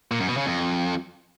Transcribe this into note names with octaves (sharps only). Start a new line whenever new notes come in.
A#2
F#2
B2
C#3
F2